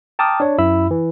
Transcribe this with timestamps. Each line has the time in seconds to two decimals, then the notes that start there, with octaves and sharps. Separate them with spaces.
0.19 G5 A5 A#5 D6 D#6 F6
0.40 D4 C#5
0.58 F#2 E4 E5 B5 E6
0.91 E3